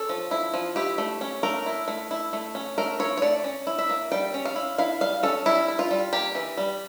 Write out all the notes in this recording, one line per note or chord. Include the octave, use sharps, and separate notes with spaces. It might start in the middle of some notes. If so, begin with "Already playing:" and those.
Already playing: C#4 A4
F3
E4
F3
E4 G4
A3
C#4
A3 A#4
E4
A3
E4
A3
C#4
A3 A#4
E4 C#5
C#5
A3 D5
C#4
E4
E5
A#3
G3 G5
C#4
F5
E4
E4 F5
G3 F5
C#4 A4
G3 E4
E4
F4
G3
A#3 G4
E3
G3